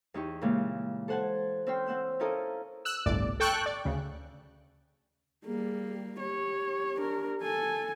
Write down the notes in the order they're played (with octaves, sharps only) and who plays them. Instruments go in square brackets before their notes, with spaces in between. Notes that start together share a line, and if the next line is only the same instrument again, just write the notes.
[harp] E2 D#4 G4 C#6
A#2 C#3 E3 G#3 A#3
A4 C5 F#5 G#5 A5
C4 C#4 G5 C6
C4 F#5 E6 G6
C#4 E4 F4 A4 A#4 D#5
[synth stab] E6 F#6
G1 C2 A2 D5
A4 G5 C#6 F#6
D5
D2 C#3
[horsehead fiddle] G3 A#3 [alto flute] G#4
[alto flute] G4 [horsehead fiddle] C#5
[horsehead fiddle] D4 A#4
A4 G#5